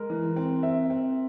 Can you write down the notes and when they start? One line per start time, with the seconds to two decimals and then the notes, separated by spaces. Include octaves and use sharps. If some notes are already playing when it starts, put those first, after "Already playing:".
Already playing: G#3 A#4
0.10 E3
0.36 C4
0.63 C4 E5
0.90 C4